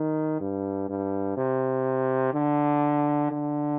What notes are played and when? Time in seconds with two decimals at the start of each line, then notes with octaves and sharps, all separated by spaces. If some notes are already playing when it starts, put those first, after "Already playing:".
Already playing: D#3
0.40 G2
0.89 G2
1.37 C3
2.34 D3
3.31 D3